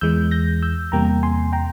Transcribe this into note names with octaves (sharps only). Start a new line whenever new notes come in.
E2 E3 G#3 E6 G6
G6 A#6
E6 G6
E2 C3 G3 A#3 G5 A#5
G#5 C6
G5 A#5